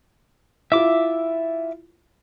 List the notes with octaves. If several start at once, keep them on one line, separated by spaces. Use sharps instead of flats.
E4 F4 E5 D6